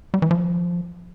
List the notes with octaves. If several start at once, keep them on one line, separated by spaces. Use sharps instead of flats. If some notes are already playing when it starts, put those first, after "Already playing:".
G3
E3
F3